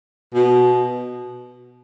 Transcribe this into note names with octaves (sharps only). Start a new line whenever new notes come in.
B2